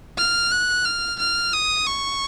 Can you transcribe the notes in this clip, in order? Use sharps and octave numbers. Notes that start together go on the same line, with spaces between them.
F6
F#6
F6
F6
D#6
C#6